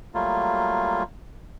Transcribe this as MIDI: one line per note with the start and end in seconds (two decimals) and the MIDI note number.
0.14 1.03 54
0.14 1.03 55
0.14 1.03 57
0.14 1.03 58
0.14 1.03 65